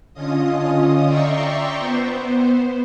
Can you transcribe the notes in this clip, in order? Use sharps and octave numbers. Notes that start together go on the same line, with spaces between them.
D3 C#4 F4 D#5 D#6
D5 E5 G5 A#5 C6 C#6
B3 C5